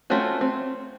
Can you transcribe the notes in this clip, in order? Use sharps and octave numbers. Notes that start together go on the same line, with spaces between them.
A3 C4 C#4 F4 F#4
C4